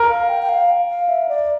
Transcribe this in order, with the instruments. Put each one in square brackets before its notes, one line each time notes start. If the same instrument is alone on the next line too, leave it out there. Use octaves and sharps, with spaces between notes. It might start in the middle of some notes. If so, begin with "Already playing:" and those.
Already playing: [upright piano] A#4
[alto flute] F5
G5
G5
F5
F5
E5
D5